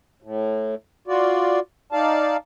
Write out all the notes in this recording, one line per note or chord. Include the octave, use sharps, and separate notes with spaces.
A2
F4 F#4 D5
D#4 D5 F5 A5